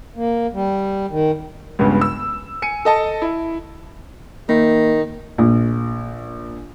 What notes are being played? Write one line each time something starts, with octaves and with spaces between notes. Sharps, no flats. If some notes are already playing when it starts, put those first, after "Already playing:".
A#3
G3
D#3
C#2 G2 C#3 B3
E6
G#5 C#7 D#7
A4 D#5 A5
E4
D#3 A#3
A#1